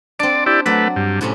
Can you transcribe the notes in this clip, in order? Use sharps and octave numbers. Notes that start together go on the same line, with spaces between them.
C4 D4 D5
E4 G4 D5
F#3 A3 B4 D5
G2
A2 C3 C#4